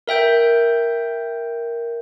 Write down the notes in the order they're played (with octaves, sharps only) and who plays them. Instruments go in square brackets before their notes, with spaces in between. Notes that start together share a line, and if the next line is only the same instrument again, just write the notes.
[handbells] A#4 E5 G5 G6